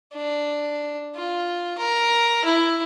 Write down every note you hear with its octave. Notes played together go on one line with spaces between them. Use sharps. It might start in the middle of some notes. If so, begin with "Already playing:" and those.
D4
F4
A#4
E4